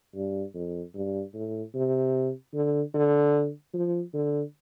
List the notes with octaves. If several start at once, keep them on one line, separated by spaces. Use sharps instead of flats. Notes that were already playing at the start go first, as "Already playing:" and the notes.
G2
F2
G2
A2
C3
D3
D3
F3
D3